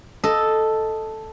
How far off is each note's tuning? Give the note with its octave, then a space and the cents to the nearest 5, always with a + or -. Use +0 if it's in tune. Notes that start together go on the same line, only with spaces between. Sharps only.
A4 +0 D#5 +0